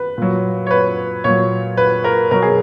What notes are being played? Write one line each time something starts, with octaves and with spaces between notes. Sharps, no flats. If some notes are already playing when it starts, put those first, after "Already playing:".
Already playing: B4
A#2 F#3
C#5
B4
A#2 F#3 C#5
B4
A#4
B2 F#3 A#4
G#4